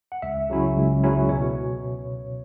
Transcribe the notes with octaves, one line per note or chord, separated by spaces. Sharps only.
F#5
C#2 E5
C#3 F#3 C#4 E4
C#2
C#3 F#3 C#4 E4
B2 C#5